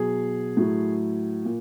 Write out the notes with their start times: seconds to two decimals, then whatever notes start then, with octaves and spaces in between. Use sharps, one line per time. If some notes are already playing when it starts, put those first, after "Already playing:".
Already playing: B2 F#3 G#4
0.57 A2 F#3
1.45 A#2